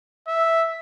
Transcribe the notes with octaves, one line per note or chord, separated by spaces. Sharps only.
E5